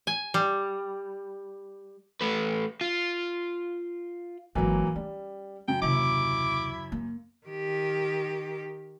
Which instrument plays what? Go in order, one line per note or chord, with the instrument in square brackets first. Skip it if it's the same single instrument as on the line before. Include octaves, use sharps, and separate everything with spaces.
[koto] G#5
G3
[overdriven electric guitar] A3 B4
F4
[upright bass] G#1 F#2 [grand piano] E3 F#3 A#3
[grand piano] G3 [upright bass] C#4
[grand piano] F#2 C#3 [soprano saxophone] G5
[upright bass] D#2 C3 [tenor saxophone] E4 [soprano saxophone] D6
[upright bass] A#3
[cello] D#3 G4